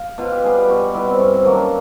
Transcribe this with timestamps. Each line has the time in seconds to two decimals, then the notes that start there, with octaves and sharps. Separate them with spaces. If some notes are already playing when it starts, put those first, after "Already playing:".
Already playing: F5
0.18 B2 F4
0.31 G4
0.44 G3 B3 G#4
0.57 G4
0.68 B2 F#4
0.94 G3 B3 E4
1.07 C4
1.19 G2 C#4
1.31 C4
1.37 C#4
1.45 D#3 F#3 A#3
1.53 D4